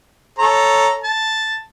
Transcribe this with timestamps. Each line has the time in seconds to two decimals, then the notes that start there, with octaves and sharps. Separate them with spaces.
0.38 A4 C#5 A#5
1.04 A5